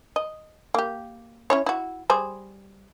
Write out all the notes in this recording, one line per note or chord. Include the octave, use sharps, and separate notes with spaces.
D#5
A#3 G4
C#4 E4 C#5
E4 F#4
G3 G#4 C5